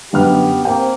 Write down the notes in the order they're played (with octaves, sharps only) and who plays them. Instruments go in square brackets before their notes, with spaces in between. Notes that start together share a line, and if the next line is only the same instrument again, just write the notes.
[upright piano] G1 F#2 F6 [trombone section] B3 G4
[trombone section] A#3 C4 [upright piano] G5